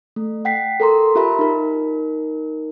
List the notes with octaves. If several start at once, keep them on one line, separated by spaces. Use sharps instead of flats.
A3
F#5 G5 B6 C7
A4 A#4 A#5 C6
F4 G4 A#4 E5 A#5 B5
D#4 A#4